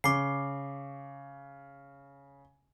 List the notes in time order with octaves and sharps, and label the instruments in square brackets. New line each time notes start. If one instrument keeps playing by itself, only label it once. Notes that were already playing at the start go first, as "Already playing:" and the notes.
[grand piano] C#3 [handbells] D6 C7